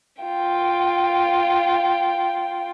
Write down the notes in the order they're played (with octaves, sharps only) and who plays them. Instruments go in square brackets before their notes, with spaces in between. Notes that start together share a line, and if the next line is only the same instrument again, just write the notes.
[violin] F4 G5